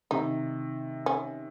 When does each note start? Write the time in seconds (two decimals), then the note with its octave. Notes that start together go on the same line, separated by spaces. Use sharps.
0.11 C3 D#3 D#4
1.06 C#4